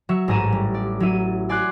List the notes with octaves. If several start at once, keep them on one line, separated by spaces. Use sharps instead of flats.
F#3 E5 C#6
A1 G#2 G#5 A#5 D#7 E7
G3
D5
F#3 E4 E5 D#7
D5 G#5 C6 D6 F#6 G#6